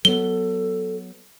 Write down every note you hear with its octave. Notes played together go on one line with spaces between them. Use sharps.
F#3 B3 A4 G7